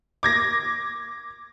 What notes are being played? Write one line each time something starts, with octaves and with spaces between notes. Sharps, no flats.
D6 G#6 A#6